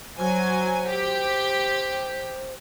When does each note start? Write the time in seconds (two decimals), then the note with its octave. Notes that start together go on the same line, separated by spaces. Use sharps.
0.18 F#3 C5 G#5
0.89 G4